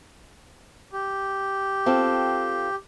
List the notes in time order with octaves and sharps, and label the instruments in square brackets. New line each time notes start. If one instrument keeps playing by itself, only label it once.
[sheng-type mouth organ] G4
[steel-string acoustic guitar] C4 F4 A4